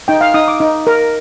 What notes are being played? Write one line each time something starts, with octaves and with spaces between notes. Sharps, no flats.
D#4 G5
F5
D#4 D#6
D6
D#4
A#4